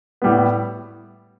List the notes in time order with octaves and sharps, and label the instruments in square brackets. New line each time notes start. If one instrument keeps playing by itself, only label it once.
[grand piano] A2 G3 B3